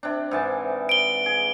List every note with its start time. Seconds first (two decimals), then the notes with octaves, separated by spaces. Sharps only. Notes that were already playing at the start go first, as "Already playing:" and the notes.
0.03 C3 D4
0.31 G#2 E3 A5
0.89 D7 G7
1.26 G#4